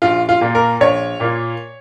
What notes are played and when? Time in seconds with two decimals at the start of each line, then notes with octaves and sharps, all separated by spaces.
0.02 A#1 F4
0.29 F4
0.41 A#2 A#3 F4
0.55 A#4
0.81 A#1 C#5
1.20 A#2 A#3 F4